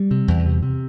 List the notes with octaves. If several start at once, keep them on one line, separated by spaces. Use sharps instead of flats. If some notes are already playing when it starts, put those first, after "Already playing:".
Already playing: G3
C3
E2
C3
C3